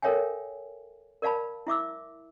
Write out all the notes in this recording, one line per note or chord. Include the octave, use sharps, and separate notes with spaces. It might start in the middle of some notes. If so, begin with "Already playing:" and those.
A4 A#4 C#5 E5 G5 G#5
A#4 D5 F5 A5 B5
E4 E5 D6 E6